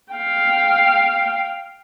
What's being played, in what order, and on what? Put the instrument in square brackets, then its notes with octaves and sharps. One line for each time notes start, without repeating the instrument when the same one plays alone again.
[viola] F5 G5